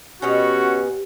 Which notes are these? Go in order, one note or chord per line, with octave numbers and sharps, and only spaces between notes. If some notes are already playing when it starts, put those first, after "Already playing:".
B2 B3 C#4 F#4 G4 G5